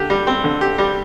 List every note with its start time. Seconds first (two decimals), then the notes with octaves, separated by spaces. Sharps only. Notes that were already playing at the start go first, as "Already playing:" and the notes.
Already playing: D3 G4
0.10 G3
0.27 C4
0.44 D3
0.61 G4
0.78 G3